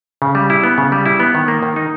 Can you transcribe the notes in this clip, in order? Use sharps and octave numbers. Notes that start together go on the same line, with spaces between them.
C#3
G3
E4
B3
C#3
G3
E4
B3
D#3
A#3
D#3
D#4